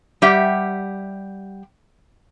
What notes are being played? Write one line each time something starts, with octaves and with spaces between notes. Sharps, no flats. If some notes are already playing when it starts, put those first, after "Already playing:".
G3 G4 E5 F#5